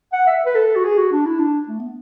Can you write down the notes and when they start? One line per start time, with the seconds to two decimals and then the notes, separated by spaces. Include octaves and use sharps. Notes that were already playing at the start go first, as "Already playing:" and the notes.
0.13 F#5
0.27 E5
0.46 B4
0.56 A4
0.76 F#4
0.84 G#4
0.98 F#4
1.12 D4
1.26 E4
1.40 D4
1.69 A3
1.80 B3